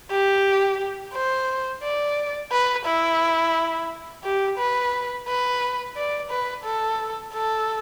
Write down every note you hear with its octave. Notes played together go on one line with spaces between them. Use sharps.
G4
C5
D5
B4
E4
G4
B4
B4
D5
B4
A4
A4